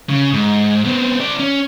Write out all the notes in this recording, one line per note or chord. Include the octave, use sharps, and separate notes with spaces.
C#3
G#2
B3 C4
C4 D5
C#4